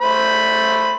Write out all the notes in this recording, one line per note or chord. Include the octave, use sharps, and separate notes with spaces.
A3 C5 B5